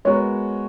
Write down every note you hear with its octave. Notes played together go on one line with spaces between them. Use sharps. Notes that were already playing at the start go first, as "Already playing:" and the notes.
G#3 B3 F#4 A#4 C#5